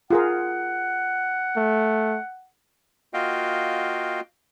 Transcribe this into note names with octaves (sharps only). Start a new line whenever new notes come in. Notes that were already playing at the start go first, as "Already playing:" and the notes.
F4 G#4 A#4 F#5
A3
A#3 F4 F#4 D#5 F5 G5